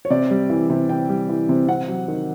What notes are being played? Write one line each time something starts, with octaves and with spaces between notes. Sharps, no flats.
C#5
C3 D5
G3
E3
C3
C3 G5
G3
E3
C3
C3 F#5
F#3
D#3